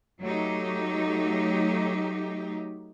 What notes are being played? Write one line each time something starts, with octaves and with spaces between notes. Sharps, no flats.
F#3 A3 D#4 G4